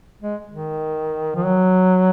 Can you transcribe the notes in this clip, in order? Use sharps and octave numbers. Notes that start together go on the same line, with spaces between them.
G#3
D#3
F3
F#3